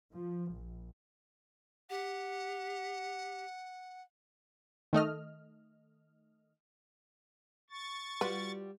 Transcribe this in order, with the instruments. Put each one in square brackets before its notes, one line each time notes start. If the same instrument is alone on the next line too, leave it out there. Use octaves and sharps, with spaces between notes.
[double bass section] F3
A#1
[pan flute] G4 [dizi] F#5
[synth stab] D#3 A3 D#5 F6
[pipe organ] C#6 A6
[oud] G3 F4 F#4 [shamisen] B4